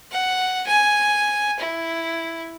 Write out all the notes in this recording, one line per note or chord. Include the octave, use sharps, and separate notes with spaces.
F#5
G#5
E4